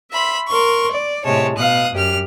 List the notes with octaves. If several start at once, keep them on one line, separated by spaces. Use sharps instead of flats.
E5 B5 C6
A#4 C6 C#6
D5
A2 C3 G#3 C#5 A5
B2 F5 D#6 F#6
F#2 G4 F6